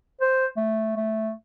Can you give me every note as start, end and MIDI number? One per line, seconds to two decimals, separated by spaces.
0.21 0.47 72
0.57 0.95 57
0.96 1.31 57